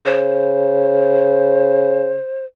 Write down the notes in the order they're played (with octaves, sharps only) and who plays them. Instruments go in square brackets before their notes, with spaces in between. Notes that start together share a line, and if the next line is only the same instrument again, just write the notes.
[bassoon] C#3 [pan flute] C5